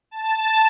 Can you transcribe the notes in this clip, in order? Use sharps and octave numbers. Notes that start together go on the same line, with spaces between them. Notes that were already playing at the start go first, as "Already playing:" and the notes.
A5